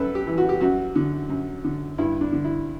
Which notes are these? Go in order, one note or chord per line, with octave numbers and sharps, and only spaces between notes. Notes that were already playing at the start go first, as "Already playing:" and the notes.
Already playing: F#2 A4 B4
G4
E3
F#4
G4
F#2 F#4
D3
F#2
D3
G2 E4
D4
D3
E4